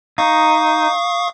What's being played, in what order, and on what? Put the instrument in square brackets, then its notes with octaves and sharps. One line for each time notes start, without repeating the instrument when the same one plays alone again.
[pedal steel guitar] D#4 [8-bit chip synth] F5 C#6 D#6